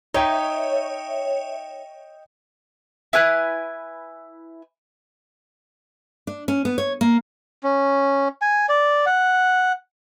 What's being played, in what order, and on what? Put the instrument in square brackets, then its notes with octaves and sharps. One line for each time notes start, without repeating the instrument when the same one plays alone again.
[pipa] D#4 [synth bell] C#5 E5 [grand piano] D#5 G5
[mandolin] E4 B4 G#5 F#6
[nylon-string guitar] D4
C#4
B3
C#5
A#3
[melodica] C#4
G#5
D5
F#5